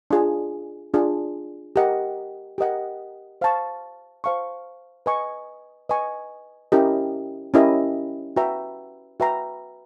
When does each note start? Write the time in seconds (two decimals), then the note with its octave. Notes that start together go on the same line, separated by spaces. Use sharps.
0.11 D4 F4 G#4
0.94 D4 F4 G#4
1.76 G4 A#4 D#5 F#5
2.58 G4 A#4 D#5 F#5
3.41 C5 F5 A5 C#6
4.24 C5 F5 A5 C#6
5.06 B4 D#5 G#5 C#6
5.89 B4 D#5 G#5 C#6
6.72 C#4 E4 G4 A#4 D#5
7.54 C#4 E4 G4 A#4 D#5
8.36 F#4 B4 E5 G5 A#5
9.20 F#4 B4 E5 G5 A#5